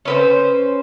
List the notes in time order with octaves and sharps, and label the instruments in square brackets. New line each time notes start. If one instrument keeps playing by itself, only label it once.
[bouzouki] C#4 B4 C5